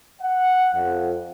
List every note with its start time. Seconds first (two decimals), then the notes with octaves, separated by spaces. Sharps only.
0.21 F#5
0.74 F2